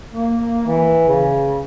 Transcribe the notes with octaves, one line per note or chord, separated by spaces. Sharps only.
A#3
E3
C#3